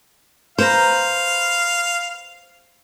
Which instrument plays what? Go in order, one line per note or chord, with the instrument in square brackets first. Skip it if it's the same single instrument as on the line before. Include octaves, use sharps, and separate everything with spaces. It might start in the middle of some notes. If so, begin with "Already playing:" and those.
[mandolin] B4 A#5 [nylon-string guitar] C5 [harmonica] F5